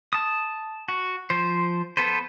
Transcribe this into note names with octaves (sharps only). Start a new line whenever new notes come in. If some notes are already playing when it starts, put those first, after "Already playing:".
A5 D#6
F#4
F3 C5
B3 A4 B4 C5